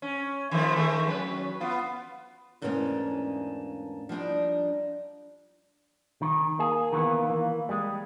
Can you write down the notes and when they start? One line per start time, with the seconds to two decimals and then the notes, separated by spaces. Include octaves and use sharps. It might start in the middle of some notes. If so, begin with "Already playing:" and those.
0.02 C#4
0.51 D#3 F3 A3
0.76 D#3 A3 G#4
1.07 F#3 C#4 B4
1.60 B3 F4
2.62 E2 G#2 A3 A#3 C#4 D4
4.09 F3 G3 D4 D#4
6.22 D#3
6.60 A#3 G#4
6.93 D#3 E3 B3
7.29 E3
7.69 G3 G#3